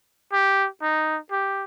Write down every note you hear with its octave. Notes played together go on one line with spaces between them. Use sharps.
G4
D#4
G4